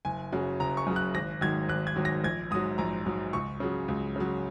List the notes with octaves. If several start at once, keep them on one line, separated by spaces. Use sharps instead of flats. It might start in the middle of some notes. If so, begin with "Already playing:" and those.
F#1 G#5
F#2 C#3 F#3
F#1 A#5
C#6
F#2 C#3 F#3
F#6
G#1 A#6
G#2 D#3 F#3 G#6
G#1 F#6
G#6
G#2 D#3 F#3
A#6
A#1 G#6
G#2 F#3 D#6
A#1 A#5
G#2 F#3
C#2 C#6
C#3 F#3
C#2
C#3 F#3